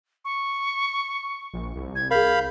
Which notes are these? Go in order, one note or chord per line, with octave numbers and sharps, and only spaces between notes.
C#6
A#1
C2
G#6
G#4 A#4 F5 B5 G6